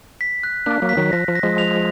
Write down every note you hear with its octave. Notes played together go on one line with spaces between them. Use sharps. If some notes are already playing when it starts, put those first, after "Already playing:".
B6
F#6
A#3 D4 F#6
F#3 A#3
B6
D#3 F#3
F3 A#6
F3
A#6
F3 G#3
F7